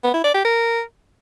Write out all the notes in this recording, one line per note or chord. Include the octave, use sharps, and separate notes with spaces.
B3
E4
D5
G4
A#4